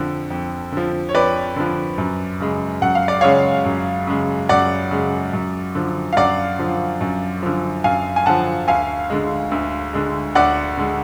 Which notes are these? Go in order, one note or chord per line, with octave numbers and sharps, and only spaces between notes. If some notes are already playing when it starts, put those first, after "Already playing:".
Already playing: F2 D3 F3
F2
D3 F3
C#5
F2 B4 D5
D3 F3
F#2
C#3 G#3
F#2 F#5
F5
D5
C#3 G#3 C#5 F5
F#2
C#3 G#3
F#2 D5 F#5
C#3 G#3
F#2
D3 F3
F5
F#2 D5 F#5
D3 F3
F#2
D3 F3
F#2 F5 G#5
G#5
D3 F3 F#5 A5
D2 F5 G#5
D3 G#3
D2
D3 G#3
D2 D5 F#5
D3 G#3